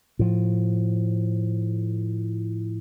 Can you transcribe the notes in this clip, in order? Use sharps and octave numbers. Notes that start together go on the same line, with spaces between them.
A2 F3